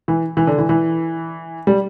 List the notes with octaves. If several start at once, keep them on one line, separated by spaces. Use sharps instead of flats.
E3
E3
D3
E3
E3
G3